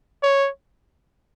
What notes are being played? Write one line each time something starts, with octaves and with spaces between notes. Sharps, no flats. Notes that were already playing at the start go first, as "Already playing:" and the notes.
C#5